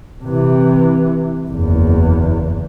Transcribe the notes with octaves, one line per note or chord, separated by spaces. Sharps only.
C3 E3
F#1 E2